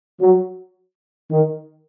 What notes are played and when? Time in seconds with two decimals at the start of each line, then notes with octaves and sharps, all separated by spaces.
0.21 F#3
1.30 D#3